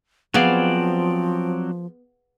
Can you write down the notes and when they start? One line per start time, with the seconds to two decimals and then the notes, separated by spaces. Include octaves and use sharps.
0.34 F3 F#3 B3 C4 G#4 D5 F5